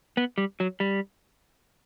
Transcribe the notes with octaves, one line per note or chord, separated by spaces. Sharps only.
B3
G3
F#3
G3